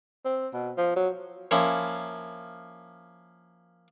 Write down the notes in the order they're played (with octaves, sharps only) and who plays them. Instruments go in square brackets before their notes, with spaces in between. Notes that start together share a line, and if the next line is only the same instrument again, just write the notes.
[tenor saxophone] C4
B2
F3
F#3
[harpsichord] F3 A#3 C#4 E4